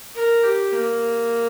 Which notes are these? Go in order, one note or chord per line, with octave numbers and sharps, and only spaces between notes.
A#4
G4
A#3